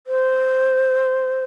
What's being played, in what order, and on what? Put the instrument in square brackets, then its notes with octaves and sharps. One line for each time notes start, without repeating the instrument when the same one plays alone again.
[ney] C5